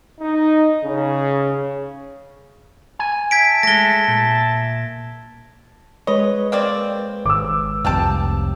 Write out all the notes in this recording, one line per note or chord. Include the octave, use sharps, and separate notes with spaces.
D#4
C#3
G#5
E5 A5 G#6 B6 D7
G#3 A3 A#6 G7
A#2
G#3 B4 C#5 D#5
A#3 C4 D5
G#1 D6 E6
F1 C2 C3 F4 G5 A5